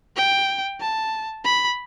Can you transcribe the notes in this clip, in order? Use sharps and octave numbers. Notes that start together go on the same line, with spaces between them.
G5
A5
B5